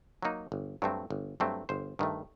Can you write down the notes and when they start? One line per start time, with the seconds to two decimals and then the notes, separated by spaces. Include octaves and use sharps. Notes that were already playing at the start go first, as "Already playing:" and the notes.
0.22 F#3 A#3 D#4
0.52 G1
0.82 G2 F#3 A3 C4
1.10 G1
1.40 G2 F#3 A3 C4
1.69 G1 C5
1.99 G2 D#3 A3